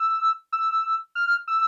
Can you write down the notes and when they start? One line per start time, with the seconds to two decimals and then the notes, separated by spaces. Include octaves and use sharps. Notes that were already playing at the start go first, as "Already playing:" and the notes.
Already playing: E6
0.53 E6
1.15 F6
1.48 E6